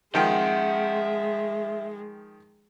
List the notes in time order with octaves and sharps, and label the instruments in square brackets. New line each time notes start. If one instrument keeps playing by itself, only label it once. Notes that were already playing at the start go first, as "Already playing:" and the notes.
[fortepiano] D#3 F3 G5 [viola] G#3 [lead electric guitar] E5 C6 [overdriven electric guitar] F#5